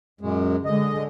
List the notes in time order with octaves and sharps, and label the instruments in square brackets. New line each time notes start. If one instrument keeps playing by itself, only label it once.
[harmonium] F#2 G#3 [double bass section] A#2
[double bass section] D3 G#3 [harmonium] D#5